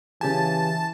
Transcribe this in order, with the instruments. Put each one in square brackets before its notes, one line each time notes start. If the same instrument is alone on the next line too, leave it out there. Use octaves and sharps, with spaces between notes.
[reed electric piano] C#3 G4 G#5 [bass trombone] E3 [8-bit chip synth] A5